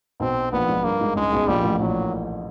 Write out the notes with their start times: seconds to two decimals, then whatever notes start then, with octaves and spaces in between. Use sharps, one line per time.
0.20 B1 B2 C4
0.52 A#1 A#2 B3
0.68 G#2
0.84 G2 A#3
1.01 G#2
1.16 C#2 C#3 G#3
1.32 B1 B2
1.47 A#1 A#2 G3
1.63 A1 A2
1.79 A#1 A#2 F#3